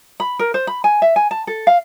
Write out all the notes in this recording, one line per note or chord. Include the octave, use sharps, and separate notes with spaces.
B5
A#4
C5
B5
G#5
E5
G#5
A5
A4
F5